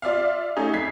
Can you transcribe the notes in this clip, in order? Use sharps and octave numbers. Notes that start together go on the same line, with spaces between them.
F4 D5 E5 F5
A3 C#4 D#4 G#4
F2 G#6 B6 C7